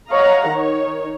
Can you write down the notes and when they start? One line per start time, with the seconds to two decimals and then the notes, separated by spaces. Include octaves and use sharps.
0.11 C#5 D#5 F5 F#5 A#5
0.49 D#3 D#4 C#5